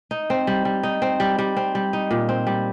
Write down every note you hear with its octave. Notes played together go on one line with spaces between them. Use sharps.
D#4
C4
G3
G3
D#4
C4
G3
G3
C4
G3
D#4
A#2
C4
G3